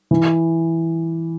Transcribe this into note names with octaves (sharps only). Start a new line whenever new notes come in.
E3